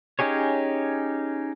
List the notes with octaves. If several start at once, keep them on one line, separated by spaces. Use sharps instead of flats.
C#4 D#4 G4 G#4 C#5